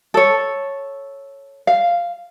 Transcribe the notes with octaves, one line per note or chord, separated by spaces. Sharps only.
A4 C#5
F5